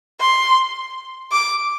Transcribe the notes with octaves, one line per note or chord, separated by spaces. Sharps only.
C6
D6